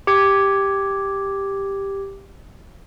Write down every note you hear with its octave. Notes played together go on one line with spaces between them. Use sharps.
G4 G#6